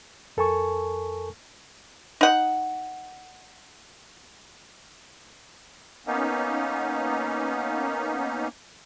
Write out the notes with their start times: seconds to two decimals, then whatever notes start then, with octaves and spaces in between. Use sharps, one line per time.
0.37 F2 A4 A#4 G#5 A5 C#6
2.21 D#4 F#5
6.07 A#3 B3 C#4 D#4